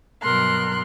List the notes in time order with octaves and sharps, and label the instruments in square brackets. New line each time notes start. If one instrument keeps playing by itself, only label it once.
[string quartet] G2 B2 F#3 A#4 C6 F#6